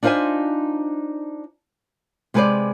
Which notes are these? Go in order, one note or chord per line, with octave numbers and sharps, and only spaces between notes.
D4 D#4 F4 C5 E5 G#5
C3 G#3 A4 B4 C5 D5